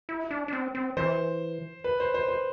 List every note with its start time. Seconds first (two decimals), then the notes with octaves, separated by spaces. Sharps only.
0.09 E4
0.31 D4
0.48 D4
0.53 C4
0.75 C4
0.97 E3 C5
1.84 B4
2.00 C5
2.14 C5
2.28 C5